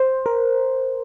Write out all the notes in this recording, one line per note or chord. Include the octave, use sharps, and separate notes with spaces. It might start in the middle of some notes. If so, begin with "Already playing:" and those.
Already playing: C5
A#4